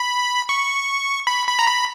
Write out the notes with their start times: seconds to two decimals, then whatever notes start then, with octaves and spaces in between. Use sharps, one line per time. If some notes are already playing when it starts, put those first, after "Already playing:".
Already playing: B5
0.49 C#6
1.27 B5
1.47 B5
1.59 A#5
1.67 B5